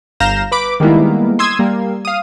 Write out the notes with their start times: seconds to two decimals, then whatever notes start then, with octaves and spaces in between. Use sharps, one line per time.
0.20 G1 F5 A#5 G6 A#6 E7
0.52 B4 B5 D6
0.80 D#3 G3 G#3 A#3 B3 E4
1.39 C6 D#6 E6 G#6
1.59 G3 A#3
2.05 F5 D#6